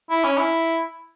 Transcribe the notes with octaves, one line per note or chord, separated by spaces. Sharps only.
E4
C#4
E4